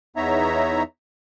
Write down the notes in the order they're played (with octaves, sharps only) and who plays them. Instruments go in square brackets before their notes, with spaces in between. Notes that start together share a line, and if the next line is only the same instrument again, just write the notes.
[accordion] E2 B3 D#4 C#5 E5 A#5